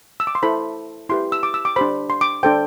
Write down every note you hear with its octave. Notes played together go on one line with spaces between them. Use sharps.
E6
D6
C6
E4 A4 C5 B5
E4 G4 B4 C6
E6
D6
E6
D6
D4 G4 C5 B5
C6
D6
D4 A4 C5 G5